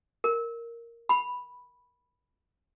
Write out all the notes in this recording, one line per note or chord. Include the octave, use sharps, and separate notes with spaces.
A#4
B5